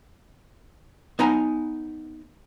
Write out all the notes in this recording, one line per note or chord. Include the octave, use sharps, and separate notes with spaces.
B3 D#4 G#5 A#5